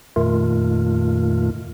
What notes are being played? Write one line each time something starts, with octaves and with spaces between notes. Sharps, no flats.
F2 A#2 D#3 A3 F4